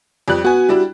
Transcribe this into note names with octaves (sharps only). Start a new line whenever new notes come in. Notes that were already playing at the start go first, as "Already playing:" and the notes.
F2 G3 F#6
B3 F#4 G#5
G3 D4 E4